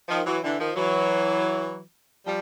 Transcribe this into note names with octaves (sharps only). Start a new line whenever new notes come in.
D#3 F3
E3 F#3
D3 E3
D#3 F3
E3 F#3
F3 G3